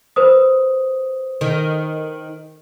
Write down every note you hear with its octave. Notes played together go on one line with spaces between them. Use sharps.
B4 C5 D#6
D#3